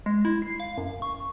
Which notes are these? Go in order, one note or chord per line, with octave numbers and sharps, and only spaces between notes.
G#3
E4
C7
F5
F#2
C#6